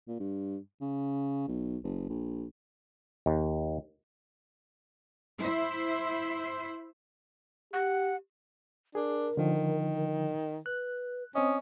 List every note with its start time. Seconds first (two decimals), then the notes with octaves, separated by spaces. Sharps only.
0.08 A#2
0.19 G2
0.81 C#3
1.48 B1
1.84 F#1
2.09 A#1
3.26 D#2
5.40 E4 C5 E5
7.73 G4 F#5
8.95 D4 G#4 A#4
9.37 D3 D#3 F3
10.66 B4 F#6
11.35 C4 C#4 D#5 D#6